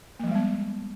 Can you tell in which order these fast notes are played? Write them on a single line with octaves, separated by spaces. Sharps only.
A#3 F3 G#3 G3 B3